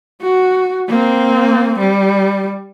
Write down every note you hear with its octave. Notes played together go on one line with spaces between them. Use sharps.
F#4
A#3 C4
G3